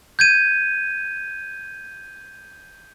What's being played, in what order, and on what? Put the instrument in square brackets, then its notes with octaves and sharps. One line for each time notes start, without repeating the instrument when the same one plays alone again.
[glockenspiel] G6 G#6 D#7